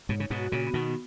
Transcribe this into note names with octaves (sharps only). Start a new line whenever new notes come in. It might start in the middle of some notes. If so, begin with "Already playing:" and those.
G#2 B2 C#5
C#3
G#2 B2
F#4
A#2 C#3
B3
B2 D#3